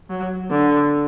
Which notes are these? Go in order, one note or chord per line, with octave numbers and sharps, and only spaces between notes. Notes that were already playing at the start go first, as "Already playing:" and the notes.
F#3
D3